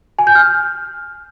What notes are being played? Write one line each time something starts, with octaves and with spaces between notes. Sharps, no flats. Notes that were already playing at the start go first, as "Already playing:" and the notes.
G#5
G6
F6